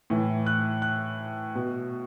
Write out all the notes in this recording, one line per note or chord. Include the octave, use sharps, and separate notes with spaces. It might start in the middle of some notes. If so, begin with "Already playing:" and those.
A2 E3
F#6
F#6
B2